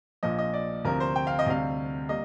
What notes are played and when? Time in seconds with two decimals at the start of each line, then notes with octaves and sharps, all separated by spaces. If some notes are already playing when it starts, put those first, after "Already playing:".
0.23 A#1 A#2 F3 D#5
0.39 D#5
0.54 D5
0.85 D2 C3 F3 A#4
1.00 C5
1.16 G5
1.27 F5
1.39 D#5
1.47 D2 C3 G3 F5
2.09 G3 A#3 D#5